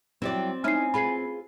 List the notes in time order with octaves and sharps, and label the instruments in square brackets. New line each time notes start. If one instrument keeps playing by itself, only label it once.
[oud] E3 G3 [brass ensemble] F#3 [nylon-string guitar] C4 D5
[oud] C#4 D#4 E4 [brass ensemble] G#5 [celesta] F6 C7
[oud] F4 G#4 B4 [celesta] B5 C7